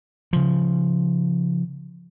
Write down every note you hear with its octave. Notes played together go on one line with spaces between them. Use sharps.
C#3 F3